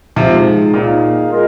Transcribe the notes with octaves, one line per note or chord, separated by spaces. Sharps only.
G#2 C3 F3 G#3 D#4 G#4
A#2 D#3 A#3 D#4 G#4 F5
G#3 F4 A#4